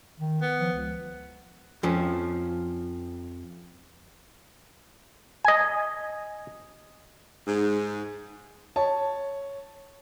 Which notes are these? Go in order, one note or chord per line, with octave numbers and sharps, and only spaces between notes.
D#3
B3
F3
C#2
F2 F3 C#4
D#5 G#5
G#2
C#5 A5